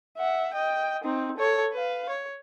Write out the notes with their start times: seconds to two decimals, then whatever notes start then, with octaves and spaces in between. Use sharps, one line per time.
0.18 E5 F#5
0.54 D#5 G5
1.04 C4 D#4
1.37 A4 C#5
1.73 B4 F5
2.09 C#5